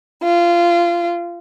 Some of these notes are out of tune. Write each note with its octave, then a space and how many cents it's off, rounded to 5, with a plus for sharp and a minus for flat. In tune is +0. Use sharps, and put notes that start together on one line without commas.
F4 -20